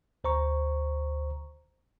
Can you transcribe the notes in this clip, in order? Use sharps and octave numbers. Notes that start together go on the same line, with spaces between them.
D2 C5 A#5 C#6